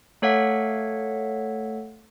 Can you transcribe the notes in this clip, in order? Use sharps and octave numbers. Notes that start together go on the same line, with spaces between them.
A3 A4 C#5 F5 F#5 B6